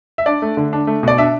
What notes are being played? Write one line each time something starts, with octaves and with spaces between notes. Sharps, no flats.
E5
D4 D5
A3
D3
D4
A3
B2 D5
D4 E5